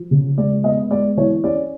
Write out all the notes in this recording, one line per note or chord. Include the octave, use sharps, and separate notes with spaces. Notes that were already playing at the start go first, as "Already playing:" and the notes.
Already playing: F3
C#3
G#3 D5
B3 D#5
G#3 D5
E3 C#5
C#4 D5